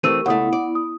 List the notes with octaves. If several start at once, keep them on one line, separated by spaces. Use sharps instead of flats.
E3 A3 C4 G4 A#4 C#6 E6 D#7
C#2 A3 B3 E4 F#5 D#6
D5
D#6